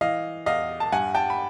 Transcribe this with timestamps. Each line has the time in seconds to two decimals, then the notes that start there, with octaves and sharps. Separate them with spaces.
0.01 E3 D#5 F5
0.46 E2 D#5 F5
0.80 A5
0.92 G2 F#5 G#5
1.15 G5 A5
1.30 B5